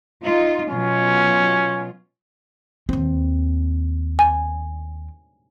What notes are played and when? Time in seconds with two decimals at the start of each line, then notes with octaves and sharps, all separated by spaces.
0.23 D#4 F4
0.69 B2 F#3 C#4 F4
2.89 D#2 C4
4.19 G#5